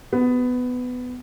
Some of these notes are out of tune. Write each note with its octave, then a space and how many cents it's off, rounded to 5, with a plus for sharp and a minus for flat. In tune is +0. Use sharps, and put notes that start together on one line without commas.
B3 +15